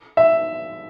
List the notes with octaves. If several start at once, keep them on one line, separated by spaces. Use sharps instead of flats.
E5